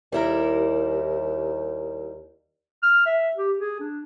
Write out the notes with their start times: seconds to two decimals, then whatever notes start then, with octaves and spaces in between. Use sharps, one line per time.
0.12 D#2 G3 E4 A#4
2.83 F6
3.06 E5
3.37 G4
3.59 G#4
3.80 D4